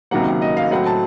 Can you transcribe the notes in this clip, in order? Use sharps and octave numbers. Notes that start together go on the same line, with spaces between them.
C#2 C3 D#3 F#3 A#3 F#5
D#5
F5
A2 F#3 C4 F#5
A5